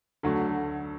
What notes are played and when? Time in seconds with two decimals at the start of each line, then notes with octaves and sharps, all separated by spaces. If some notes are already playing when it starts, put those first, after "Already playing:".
0.23 D2 D3 F#3 A3